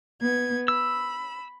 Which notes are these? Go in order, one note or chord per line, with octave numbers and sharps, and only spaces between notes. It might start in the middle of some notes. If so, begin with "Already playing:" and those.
B3 G#6
B5 E6